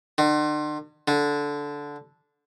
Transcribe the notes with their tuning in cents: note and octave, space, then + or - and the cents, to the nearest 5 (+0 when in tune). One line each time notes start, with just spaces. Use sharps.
D3 +45
D3 -10